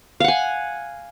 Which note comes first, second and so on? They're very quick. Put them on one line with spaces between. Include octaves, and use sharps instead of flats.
F5 F#5 G#5